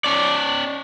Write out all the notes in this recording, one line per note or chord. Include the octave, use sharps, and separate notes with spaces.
C#4 D5